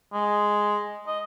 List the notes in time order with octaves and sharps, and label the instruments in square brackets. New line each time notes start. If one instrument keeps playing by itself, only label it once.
[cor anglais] G#3
D#5